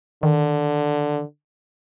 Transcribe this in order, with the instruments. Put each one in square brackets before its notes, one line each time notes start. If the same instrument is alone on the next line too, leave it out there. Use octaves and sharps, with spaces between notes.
[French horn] D3 [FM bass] D#3